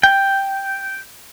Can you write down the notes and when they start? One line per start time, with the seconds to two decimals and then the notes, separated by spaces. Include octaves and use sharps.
0.03 G5